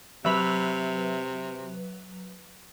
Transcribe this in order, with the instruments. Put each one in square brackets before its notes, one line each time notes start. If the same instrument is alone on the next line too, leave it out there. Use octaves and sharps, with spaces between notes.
[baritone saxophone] C3 [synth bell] F#3 B4 F7 [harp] E5 B5